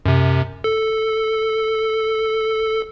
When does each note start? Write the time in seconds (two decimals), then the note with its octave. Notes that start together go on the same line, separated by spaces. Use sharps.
0.06 F#2 C3
0.64 A4